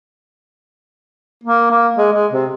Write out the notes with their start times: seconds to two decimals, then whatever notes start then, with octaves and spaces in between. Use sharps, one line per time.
1.43 A#3
1.71 A#3
1.97 G#3
2.12 G#3
2.32 C3